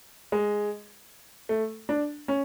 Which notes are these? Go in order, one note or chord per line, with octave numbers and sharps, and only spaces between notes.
G#3
A3
D4
C#4